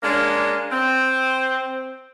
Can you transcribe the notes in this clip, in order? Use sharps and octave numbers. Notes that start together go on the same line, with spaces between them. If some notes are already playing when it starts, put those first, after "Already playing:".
G#3 A#3 C#4 D4
C4